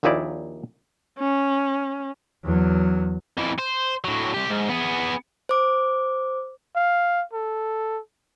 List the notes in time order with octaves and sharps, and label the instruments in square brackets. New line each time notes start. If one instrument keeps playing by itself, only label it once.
[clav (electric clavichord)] A#1 D#2 A#2 D#4 E4 D5
[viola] C#4
[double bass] E2 F#3
[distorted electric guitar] F2 E3
C5
A2 F#3
C2 G4
G#2
B3 G#4
[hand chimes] C5 D6
[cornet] F5
A4